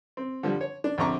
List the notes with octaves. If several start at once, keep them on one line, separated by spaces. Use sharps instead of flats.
C4
D3 F3 G3
C#5
D4
A#1 D3 C4 A#5 C#6 D6